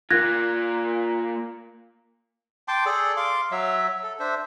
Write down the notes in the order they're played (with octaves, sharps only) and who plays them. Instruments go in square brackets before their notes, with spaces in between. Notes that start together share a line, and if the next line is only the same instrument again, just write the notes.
[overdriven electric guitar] A#3 F4 [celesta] F#6 G#6 A#6
[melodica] G5 A5 C6 D6
G#4 A4 D5
F5 C6 D6
F#3 E5
A4
D4 C5 E5